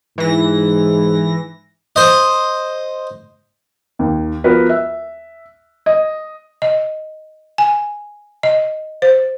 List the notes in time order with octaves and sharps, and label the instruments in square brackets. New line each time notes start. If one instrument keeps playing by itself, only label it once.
[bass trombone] G#2 [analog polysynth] E3 A#6
[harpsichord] C5 D#5
[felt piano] D#2
F3 B3 F#4 A#4 B4
E5
D#5
[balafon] D#5
G#5
D#5
C5